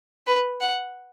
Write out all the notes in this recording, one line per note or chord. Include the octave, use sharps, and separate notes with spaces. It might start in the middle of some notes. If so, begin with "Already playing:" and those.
B4
F#5